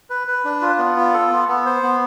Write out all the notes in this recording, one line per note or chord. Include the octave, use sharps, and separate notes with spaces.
B4
B4
D4
F4
B3
F4
A4
B3
B3
C5
B3